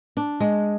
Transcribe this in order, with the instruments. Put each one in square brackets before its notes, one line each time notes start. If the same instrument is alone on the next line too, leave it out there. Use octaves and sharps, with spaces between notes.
[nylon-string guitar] D4
G#3